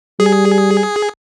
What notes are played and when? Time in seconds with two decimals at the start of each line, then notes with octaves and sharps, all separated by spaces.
0.20 G3 G#4